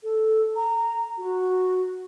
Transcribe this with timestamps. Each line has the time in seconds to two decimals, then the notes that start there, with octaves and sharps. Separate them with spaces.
0.03 A4
0.56 A#5
1.18 F#4